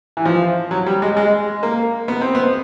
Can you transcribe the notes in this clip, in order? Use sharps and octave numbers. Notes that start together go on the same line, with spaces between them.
E3
F3
F#3
G3
G#3
G#3
A#3
B3
C4
B3